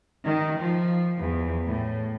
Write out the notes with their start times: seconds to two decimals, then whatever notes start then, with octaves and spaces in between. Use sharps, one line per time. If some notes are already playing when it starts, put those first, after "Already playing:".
0.23 D#3
0.56 F3
1.17 E2
1.67 A2